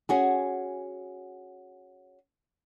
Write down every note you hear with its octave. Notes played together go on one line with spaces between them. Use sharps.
C#4 F#4 G#4